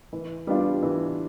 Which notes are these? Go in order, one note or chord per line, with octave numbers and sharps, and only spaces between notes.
E3
G3 B3 D4 F4
E3